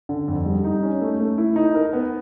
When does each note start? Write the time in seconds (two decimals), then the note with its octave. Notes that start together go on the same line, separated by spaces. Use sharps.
0.09 D3
0.28 F2
0.46 G3
0.64 D#4
0.83 C#4
1.01 A3
1.20 A3
1.38 E4
1.56 D#4
1.75 A#4
1.93 B3